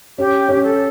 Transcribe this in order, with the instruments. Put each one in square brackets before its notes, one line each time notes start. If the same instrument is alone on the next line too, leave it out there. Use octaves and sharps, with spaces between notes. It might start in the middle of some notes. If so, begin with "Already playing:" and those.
[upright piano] C#4 [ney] G4
[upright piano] C#4
[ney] A4